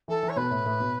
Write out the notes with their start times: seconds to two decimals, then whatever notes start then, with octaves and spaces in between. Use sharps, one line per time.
0.08 E3 A4
0.23 E3
0.28 C#5
0.36 B2 B4
0.51 A2
0.66 A2
0.80 B2